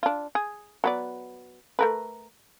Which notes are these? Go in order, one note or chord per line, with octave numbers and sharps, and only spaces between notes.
D4 F4
G#4
F#3 B3 D5
A3 A#4 B4